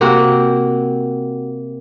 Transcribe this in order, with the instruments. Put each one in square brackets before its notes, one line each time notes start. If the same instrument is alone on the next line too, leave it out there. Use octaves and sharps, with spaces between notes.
[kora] C3 A#3 C4 F#4